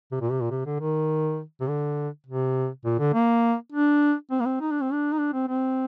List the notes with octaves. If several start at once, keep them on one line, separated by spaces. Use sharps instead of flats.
C3
A#2
C3
A#2
C3
D3
D#3
C3
D3
C3
A#2
D3
A#3
D4
C4
A#3
C4
D#4
D4
C4
D4
D#4
D4
C4
C4